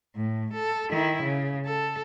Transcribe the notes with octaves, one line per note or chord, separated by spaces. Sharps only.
A2
A4
D#3 E4
C#3
A4